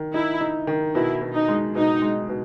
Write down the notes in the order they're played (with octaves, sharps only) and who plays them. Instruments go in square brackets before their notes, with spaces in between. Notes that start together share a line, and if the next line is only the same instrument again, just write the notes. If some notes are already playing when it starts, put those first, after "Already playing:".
Already playing: [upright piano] D#3
[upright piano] D#4 [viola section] E4
[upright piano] D#4
D#3
[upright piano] B2 [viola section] E4
[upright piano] B2
[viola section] D#4
[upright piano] G#3
[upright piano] B2 [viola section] D#4
[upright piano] G#3
B2